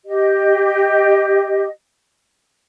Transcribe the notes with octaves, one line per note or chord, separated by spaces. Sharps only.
G4 D#5